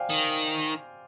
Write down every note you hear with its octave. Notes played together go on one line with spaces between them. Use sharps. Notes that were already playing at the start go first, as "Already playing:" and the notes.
Already playing: C5 D5 F5 G5 G#5
D#3